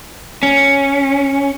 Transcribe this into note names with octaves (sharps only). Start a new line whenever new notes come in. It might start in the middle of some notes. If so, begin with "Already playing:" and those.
C#4